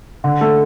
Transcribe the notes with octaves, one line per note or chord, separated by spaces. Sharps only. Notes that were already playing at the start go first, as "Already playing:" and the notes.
D3
A3 A4